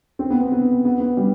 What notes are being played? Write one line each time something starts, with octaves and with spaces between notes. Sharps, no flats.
C4
B3
B3
B3
B3
B3
G3